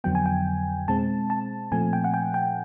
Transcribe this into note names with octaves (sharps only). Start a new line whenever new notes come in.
F2 D3 F#3 B3 G5
G#5
G5
B2 G#3 C4 A5
A5
A#2 F3 A3 C4 G#5
G5
F#5
G5
G5